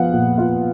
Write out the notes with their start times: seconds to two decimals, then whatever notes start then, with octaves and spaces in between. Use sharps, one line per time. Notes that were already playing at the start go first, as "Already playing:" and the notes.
Already playing: F3 B3 F5 F#5
0.13 A#2
0.38 F4